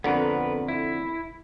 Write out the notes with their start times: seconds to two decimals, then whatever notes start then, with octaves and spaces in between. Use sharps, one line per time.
0.04 F2 D3 B3 A#4 B4
0.68 E4